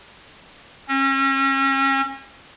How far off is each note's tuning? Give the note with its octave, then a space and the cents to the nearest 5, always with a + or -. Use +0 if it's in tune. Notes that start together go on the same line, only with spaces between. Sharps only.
C#4 -35